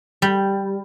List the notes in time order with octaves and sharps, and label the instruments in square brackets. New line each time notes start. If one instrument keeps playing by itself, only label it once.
[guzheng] G3